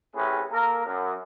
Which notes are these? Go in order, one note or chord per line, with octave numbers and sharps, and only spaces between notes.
A2 C3 C#4 G#4 B4
A#3 A4 A#4
F#2